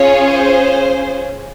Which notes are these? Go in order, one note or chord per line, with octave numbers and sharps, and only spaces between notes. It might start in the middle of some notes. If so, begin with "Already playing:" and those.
Already playing: C#4 F4 G#4 C#5
C5